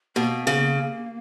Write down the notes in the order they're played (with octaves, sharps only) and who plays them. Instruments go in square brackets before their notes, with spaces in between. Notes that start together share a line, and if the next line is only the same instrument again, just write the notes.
[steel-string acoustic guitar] B2 [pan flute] A#3
[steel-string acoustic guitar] C#3